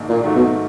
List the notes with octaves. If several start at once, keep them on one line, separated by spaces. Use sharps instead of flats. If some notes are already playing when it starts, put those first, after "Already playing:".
Already playing: A#1 G#2 D#3
A#2
G#2 D#3 F#3 A3
B2